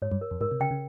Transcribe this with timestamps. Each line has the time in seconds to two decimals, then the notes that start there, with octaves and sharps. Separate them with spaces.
0.02 G#2 C#5
0.12 G2
0.21 A#4
0.31 F2
0.41 G#2 A#4
0.51 C3
0.60 C#3 G5
0.71 C#3